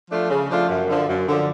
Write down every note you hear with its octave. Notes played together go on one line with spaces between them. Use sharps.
F3 A3 D4 F4
C#3
F3 A3 D4 F4
F#2
D3 F3
F#2
D3 F3